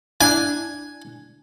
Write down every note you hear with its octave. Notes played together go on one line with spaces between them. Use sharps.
D4 E4 G#5 F#6